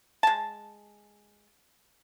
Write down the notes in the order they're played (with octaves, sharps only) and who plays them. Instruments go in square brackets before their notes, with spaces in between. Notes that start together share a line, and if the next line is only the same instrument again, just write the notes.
[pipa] G#3 A5